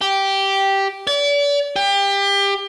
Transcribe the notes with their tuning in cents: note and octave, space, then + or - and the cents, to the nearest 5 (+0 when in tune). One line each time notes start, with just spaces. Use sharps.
G4 -5
D5 -40
G4 +25